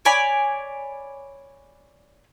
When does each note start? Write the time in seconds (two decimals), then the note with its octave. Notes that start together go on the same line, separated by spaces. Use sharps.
0.05 C#5 D5 G#5 B5